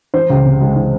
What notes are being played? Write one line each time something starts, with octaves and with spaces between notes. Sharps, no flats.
E3 C5
C#2
C3
G#3
E3